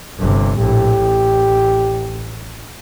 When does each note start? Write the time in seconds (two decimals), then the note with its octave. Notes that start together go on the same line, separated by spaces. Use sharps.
0.19 G1 C3
0.58 A#1 A2 G4
1.00 A1